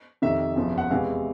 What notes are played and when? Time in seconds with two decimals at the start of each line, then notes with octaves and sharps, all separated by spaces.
0.22 F2 C3 D#3 E5
0.56 F#1 E2 C3 F3
0.78 F#5
0.90 E2 C3 E3 G#3 F5